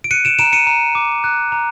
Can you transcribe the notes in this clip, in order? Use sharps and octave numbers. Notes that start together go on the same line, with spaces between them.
D7
F#6 C#7 D#7
D7 E7
A#5 D7 E7
C#7 D#7
A#5
D6
F#6
A#5